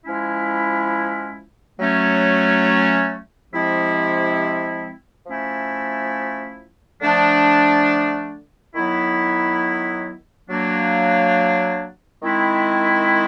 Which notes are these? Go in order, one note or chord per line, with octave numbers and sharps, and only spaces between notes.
F3 G#3 C#4 E4
F#3 A3 C#4
C3 F3 G#3 C4 E4
F3 A3 C#4 E4
D3 F3 A3 D4
D#3 F#3 B3 E4
F#3 A#3 D4
D#3 G#3 C4 E4